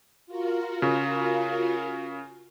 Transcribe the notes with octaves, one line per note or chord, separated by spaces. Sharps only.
F4 F#4 A#4
C#3